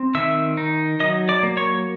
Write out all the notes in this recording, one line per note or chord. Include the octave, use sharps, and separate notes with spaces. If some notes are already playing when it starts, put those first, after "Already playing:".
Already playing: C4
D#3 E5 E6
D#4
F#3 D#5 D#6
D5 D6
A#3
C#5 C#6